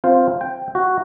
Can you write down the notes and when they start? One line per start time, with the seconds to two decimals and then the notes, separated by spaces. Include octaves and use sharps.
0.04 C4 F4 C5
0.41 G5
0.75 F#4